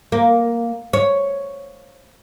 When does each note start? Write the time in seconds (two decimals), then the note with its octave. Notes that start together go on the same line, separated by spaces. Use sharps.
0.12 A#3
0.93 C#5